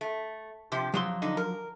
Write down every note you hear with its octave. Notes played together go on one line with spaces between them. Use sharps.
A3
C3 F3 G4
F2 F3 F#3 C6
D3 D#4
A#4